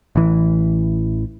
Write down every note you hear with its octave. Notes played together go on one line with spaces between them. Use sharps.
A1 E3